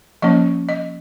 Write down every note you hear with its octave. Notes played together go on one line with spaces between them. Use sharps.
F3 A#3 C#4 D#5
D#5